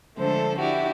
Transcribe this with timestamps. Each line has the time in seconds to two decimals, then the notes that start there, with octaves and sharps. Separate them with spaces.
0.17 D3 F3 G#3 A3 A4 C5
0.59 D4 E4 F#4 G4